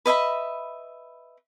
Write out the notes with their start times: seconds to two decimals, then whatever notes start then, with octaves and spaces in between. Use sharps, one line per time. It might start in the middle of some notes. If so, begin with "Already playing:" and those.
0.06 B4 D#5 E5 B5